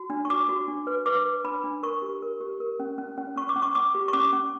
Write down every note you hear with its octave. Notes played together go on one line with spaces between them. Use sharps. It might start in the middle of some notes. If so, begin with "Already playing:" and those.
Already playing: F#4
D4
C#6
F#4 D6
F#4
D4
B4
B4 D6
B4
D4 B5
D4
A#4 C#6
G4
A#4
G4
A#4
C#4
C#4
C#4
C#4 C#6
D6
C#4
C#6
C#4 D6
G4
C#6
C#4 D6
C#4